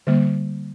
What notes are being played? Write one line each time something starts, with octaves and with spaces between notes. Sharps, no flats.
D3 G3 A#3